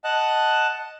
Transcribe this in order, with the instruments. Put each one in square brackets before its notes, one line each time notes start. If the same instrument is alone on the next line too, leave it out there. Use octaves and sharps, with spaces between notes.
[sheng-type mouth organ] D#5 F#5 A5 F#6